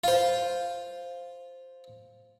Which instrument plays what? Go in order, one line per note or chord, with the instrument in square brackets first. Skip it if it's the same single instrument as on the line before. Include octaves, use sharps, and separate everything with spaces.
[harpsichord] F4 C5